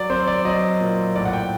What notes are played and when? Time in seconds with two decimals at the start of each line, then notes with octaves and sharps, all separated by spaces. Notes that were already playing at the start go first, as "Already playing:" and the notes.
Already playing: F#3 D5
0.10 C4 C5
0.27 D5
0.45 F#3 D#5
0.81 A#2
1.15 A2 D5
1.25 F#5
1.33 G5